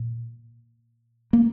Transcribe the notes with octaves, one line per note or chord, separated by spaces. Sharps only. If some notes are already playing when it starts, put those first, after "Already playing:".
Already playing: A#2
A#3